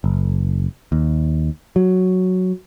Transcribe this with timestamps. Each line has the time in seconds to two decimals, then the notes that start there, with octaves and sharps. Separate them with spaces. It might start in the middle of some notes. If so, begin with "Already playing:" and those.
0.04 F#1
0.92 D#2
1.76 F#3